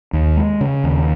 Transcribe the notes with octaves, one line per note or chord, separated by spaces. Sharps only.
D#2
G#3
C#3
D#2